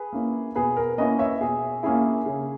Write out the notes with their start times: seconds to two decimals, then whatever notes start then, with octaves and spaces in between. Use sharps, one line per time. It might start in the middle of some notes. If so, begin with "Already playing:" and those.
Already playing: G#4 B4
0.13 A#3 C#4 E4
0.55 B2 G#4 B4
0.77 A#4
0.98 A#3 C#4 E4 B4 D#5
1.19 C#5 E5
1.41 B2 G#4
1.83 A#3 C#4 E4 G#4
2.26 C#3